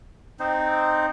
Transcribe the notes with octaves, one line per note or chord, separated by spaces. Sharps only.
C4 D#4 C5